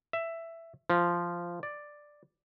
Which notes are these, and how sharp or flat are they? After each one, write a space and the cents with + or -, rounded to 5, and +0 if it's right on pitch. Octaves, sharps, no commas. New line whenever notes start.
E5 +10
F3 -10
D5 +5